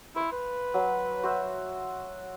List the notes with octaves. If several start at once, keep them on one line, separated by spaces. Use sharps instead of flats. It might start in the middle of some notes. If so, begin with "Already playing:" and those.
E4 C5 F5
B4
F#3
F#4 C5 E5